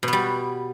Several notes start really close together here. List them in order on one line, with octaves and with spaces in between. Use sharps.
B2 B3 G3